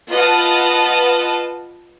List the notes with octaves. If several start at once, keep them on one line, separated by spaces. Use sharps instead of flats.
F4 B4 D#5 F#5 A5